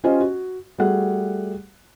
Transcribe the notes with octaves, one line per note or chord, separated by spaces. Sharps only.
C#4 F4 G4 C5 D#5 G#5
F#4
G3 A3 F#4 G#4 F#5